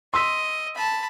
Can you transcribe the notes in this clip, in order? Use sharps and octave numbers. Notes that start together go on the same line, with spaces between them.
D#5 C6 E6 B6
A5 B5